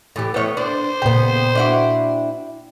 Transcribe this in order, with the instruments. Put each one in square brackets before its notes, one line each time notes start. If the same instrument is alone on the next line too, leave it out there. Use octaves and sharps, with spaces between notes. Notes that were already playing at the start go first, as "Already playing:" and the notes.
[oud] A2 E3 G4
[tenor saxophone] A2 [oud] B3 C#5
[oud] D4 [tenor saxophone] C5
[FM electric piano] A#2 G5 [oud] C#3 B3
[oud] D4 E4 F#4